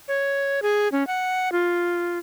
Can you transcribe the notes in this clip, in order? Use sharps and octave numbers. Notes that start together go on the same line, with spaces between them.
C#5
G#4
C#4
F#5
F4